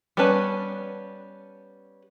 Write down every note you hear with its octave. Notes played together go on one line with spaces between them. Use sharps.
G3 B3 C#4 B4 A5